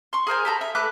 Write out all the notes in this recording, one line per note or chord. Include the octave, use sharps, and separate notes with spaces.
C6 C#6
G#4 A#4 C5 G#5
G4 A4 A#5 B5
E5
A3 B4 D6 F#6